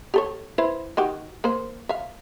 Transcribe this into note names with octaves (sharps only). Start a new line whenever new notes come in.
G4 A4 C#5
E4 B4 C5
D#3 F#4 G4
A#3 C5
E5 F5